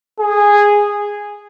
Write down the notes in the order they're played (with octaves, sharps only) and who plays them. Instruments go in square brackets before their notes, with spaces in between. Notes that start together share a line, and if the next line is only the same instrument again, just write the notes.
[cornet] G#4